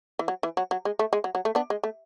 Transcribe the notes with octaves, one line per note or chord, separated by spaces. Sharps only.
E3
F#3
E3
F#3
F#3
G#3
A3
G#3
F#3
F#3
A3
B3 D4
G#3
A3